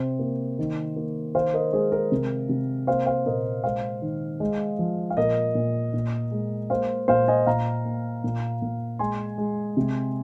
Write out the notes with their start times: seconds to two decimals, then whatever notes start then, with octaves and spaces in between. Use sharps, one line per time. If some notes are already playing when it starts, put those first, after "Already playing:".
Already playing: C3 C5
0.19 A#3
0.59 D#3
0.96 A#3
1.35 D#3 C5 F5
1.54 A#4 D#5
1.73 G#3 G#4 C5
1.92 A#4
2.12 C3
2.49 C3
2.87 A#3 C5 F5
3.06 C5 F5
3.26 A#2 A#4 D#5
3.64 G#3 C5 F5
4.02 D#3
4.40 G#3
4.79 F3
5.10 F5
5.17 A#2 A#4 D#5
5.55 A#2
5.94 A#2
6.31 G#3
6.70 A#3 C5 F5
7.08 A#2 C5 F5
7.28 D#5 G#5
7.46 A#2 F5 A#5
7.85 A#3
8.24 A#2
8.62 A#2
8.99 G#3 G#5 C6
9.38 G#3
9.77 C3